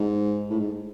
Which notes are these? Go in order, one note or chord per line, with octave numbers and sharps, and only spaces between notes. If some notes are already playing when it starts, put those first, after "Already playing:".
Already playing: G#2
A2
G#2